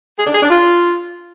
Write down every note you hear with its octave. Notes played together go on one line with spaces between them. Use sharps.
G#4
D4
G#4
D4
F4